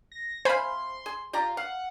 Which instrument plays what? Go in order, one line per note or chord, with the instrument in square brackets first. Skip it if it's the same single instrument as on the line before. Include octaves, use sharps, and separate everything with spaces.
[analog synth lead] A#6
[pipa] C3 F5 [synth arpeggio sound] C5 G#5 B5 [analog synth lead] C6
[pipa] G#4
[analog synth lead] F4 [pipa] G4 D5 A#5
[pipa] F5 [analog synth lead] F#5